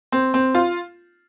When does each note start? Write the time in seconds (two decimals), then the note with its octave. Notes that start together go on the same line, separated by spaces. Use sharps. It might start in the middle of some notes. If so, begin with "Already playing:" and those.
0.12 C4
0.34 C4
0.55 F4